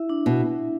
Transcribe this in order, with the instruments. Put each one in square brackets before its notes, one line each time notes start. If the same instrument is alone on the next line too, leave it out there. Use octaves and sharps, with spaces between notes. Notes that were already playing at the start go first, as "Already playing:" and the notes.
Already playing: [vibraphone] E4 E5
D4
[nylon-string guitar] B2 [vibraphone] D4